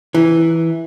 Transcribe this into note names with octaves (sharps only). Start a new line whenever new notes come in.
E3 E4